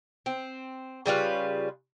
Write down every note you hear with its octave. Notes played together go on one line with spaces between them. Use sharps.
C4
C#3 G3 F4 B4